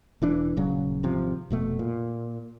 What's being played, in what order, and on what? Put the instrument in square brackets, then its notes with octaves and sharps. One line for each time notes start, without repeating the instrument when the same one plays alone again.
[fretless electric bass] E1 E3 D4
D#1 C#3 F#3
G#1 C3 F3
F1 B2 A3
A#2